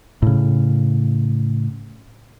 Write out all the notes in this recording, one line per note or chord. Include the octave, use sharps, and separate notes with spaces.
A2 C#3